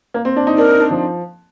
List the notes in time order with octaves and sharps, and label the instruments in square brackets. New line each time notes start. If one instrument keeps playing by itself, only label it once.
[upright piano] A#3
C4
D4
D#4
[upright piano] D4 [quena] A#4
[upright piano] D#4
D4
F3